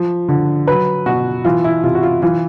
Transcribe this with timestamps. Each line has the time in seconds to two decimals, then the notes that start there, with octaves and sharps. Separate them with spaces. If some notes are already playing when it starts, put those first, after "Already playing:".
Already playing: F3
0.28 D3
0.68 F#3 B4
1.06 B2 F#4
1.45 E3 F4
1.64 E4
1.84 C3 F4
1.95 F#4
2.03 F4
2.22 E3 F4